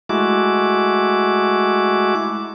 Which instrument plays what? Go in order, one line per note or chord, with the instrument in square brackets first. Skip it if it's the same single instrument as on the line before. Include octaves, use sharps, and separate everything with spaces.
[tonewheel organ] G#3 A3 E4 F#4 D6